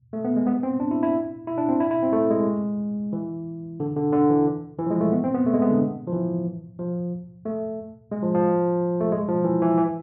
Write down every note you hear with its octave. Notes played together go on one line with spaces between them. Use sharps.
A3
B3
G#3
B3
C4
D4
E4
E4
E4
D4
C4
E4
E4
C4
A3
G#3
E3
D3
D3
D3
E3
E3
F3
G#3
A3
B3
C4
B3
A3
G#3
B3
D3
F3
E3
F3
A3
G#3
F3
F3
A3
G#3
F3
E3
E3
E3